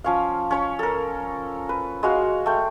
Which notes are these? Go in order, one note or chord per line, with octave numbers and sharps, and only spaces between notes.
F3 C#4 F5
C#4 C#5 C#6
A4 A#4
B4
G#3 F#4 F5 C6
A3 G5